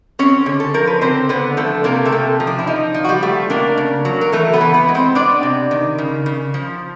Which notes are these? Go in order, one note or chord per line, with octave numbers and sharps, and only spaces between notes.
C4 C#4 C#5
D3 G#4
A4
F3 A#4
B4
D3 C4 C5
D3 B3 B4
F3 A3 A4
C3 A#3 A#4
A3 A4
C3
F3
D4
E4
F3 D#4
F3
F#4
G3 G4
A3
A#3 D4 A#4
C#3
F#3
A#4
E3 A3 A4
B3 B4
E3
B3 B4
G#3
C4 C5
B3 D4 D5
C3
D#3
C#3
C#3
F3